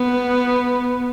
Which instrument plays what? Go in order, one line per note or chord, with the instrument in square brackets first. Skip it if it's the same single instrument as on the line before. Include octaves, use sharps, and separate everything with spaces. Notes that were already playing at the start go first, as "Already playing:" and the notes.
Already playing: [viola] B3